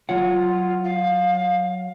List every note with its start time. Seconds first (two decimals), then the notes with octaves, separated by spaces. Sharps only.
0.09 F#3 F4 C#5 F#5
0.84 F5